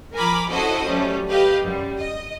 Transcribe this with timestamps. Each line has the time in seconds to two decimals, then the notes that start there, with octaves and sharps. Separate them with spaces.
0.14 F3 A#4 G#5 A#5 B5 D6
0.50 C#4 E4 F#4 A4 C5 D#5
0.85 F#3 G3 A3 C#4
1.30 G4 B4 D#5 F5
1.63 F#2 G3
1.98 D#5